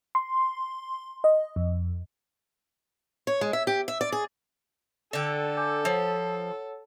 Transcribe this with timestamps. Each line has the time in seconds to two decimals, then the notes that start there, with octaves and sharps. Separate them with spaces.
0.15 C6
1.24 D#5
1.56 F2
3.27 C#5
3.41 G#3
3.53 E5
3.67 G4
3.88 E5
4.01 D5
4.12 G#4
5.13 D3 A4 D5 G5
5.57 G#5 D6 G6
5.85 F3 C#5 F#5